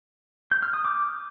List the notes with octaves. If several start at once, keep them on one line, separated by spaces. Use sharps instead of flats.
G6
F6
D#6
D6